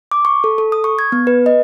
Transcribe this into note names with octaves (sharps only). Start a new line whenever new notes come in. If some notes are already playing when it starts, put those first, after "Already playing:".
D6
C#6
A4
A4
D#6
C#6
G#6
B3
B4
D#5